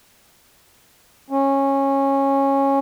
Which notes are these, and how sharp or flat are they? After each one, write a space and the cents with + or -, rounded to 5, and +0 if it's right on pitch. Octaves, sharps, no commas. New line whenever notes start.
C#4 -15